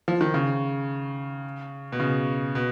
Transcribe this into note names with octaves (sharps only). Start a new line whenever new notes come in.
F3
D#3
C#3
B2
C#3
B2